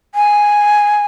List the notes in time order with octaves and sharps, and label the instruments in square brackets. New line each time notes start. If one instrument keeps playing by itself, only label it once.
[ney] G#5